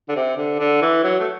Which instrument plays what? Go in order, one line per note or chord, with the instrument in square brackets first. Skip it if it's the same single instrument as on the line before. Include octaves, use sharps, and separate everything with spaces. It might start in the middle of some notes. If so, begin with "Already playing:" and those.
[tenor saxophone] D3
C3
D3
D3
E3
F#3
A3